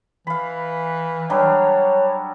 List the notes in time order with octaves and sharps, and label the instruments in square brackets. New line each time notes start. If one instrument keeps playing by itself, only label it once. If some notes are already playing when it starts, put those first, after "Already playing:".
[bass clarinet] E3 [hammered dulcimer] F5 B5
[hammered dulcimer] F#3 G3 D4 [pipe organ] C#5